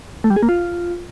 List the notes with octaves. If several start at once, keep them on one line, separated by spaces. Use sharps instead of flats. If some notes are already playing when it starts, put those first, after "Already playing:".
A3
G3
G#4
A#3
F4